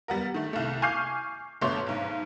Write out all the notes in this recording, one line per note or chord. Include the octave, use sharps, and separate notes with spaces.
G3 B3 A#4
D#3 A3
C2 A3
G#5 C#6 D6 F6 G6 C7
G1 B2 A3 C#5 C6 D6
B1 G#2